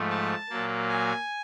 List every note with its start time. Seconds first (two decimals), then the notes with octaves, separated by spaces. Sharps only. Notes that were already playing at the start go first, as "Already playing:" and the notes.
Already playing: G#2 F3 A3
0.10 A5
0.50 A#2 F#3 A#3
0.89 G#5